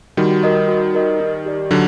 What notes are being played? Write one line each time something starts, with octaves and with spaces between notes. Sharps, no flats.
D#3 G3 F#4
A#4 D#5
F#4
A#4 D#5
D#4
G4 D5
D3 F#3 D#4